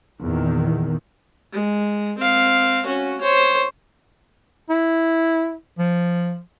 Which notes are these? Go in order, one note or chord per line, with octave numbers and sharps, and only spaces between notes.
E2 A#2 D#3
G#3
C4 F5
C#4 F#4
C5 C#5
E4
F3